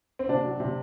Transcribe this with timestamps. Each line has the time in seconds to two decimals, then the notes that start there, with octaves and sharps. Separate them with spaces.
0.19 C4
0.29 C3 D4
0.44 F#3
0.60 C3